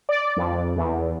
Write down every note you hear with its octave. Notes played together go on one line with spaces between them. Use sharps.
D5
F2
E2